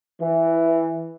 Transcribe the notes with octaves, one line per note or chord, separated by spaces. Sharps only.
E3